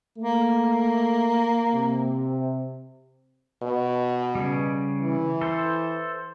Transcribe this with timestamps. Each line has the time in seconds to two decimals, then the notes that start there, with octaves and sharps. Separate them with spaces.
0.18 A3 A#3
1.74 C3
3.63 B2
4.35 C#3 G3
5.02 E3
5.41 A4 C5